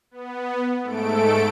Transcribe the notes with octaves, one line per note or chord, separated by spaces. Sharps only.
B3
G#2 A3 A4 D7